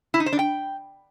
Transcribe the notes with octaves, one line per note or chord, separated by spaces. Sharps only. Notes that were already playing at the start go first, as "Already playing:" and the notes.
E4
D#4
C5
D4
G5